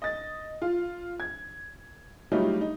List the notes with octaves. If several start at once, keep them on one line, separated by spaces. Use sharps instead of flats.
D#5 A6
F4
G#6
F#3 G3 A3 D#4 F4 G4
D#4